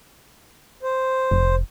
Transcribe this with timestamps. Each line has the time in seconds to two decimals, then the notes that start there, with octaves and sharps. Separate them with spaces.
0.83 C5
1.31 F1